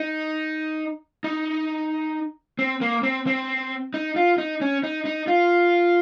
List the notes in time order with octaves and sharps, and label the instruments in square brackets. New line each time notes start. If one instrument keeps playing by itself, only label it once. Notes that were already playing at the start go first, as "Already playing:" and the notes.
Already playing: [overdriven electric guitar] D#4
D#4
C4
A#3
C4
C4
D#4
F4
D#4
C#4
D#4
D#4
F4